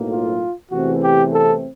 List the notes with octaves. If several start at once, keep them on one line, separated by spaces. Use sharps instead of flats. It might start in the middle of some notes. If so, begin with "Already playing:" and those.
Already playing: B1 A2 F#3 A#3
F4
E2 C3 E3 A3 C4 F#4
G4
A4